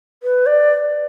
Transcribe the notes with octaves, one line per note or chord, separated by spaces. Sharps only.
B4
D5